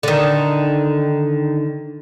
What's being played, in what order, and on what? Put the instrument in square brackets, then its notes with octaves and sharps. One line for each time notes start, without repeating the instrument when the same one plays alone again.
[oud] D3 D#3